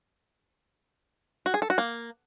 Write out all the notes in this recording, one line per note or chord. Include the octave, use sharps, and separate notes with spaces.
F#4
G#4
A4
F#4
A#3